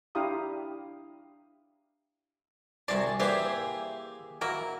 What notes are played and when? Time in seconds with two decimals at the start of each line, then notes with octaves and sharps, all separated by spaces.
0.15 D4 E4 G4 F5 A#5 D#6
2.88 C2 C3 F#4 G#4 D5 A5
3.20 E3 A#3 G4 G#4 C5 E5
4.41 F#3 A#3 E4 A#4